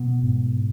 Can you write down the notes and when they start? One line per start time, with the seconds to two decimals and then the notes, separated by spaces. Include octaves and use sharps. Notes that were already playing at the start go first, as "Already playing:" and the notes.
Already playing: B2 B3
0.23 G#2